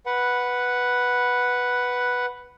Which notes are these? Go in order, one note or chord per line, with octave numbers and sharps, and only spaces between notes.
B4 F#5